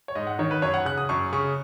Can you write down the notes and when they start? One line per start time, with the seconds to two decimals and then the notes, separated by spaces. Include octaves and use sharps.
0.08 C#5
0.15 G#2 D#5
0.27 F#5
0.39 D#3 C#5
0.51 B4
0.62 F#2 C#5
0.74 F#5
0.85 C#3 F#6
0.98 D#6
1.09 F#2 C#6
1.33 C#3 C#6